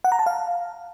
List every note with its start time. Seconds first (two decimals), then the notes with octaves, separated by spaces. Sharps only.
0.04 F#5
0.12 A#5
0.19 A5
0.26 F5